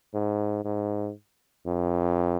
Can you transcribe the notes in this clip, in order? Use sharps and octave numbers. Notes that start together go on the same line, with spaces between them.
G#2
G#2
F2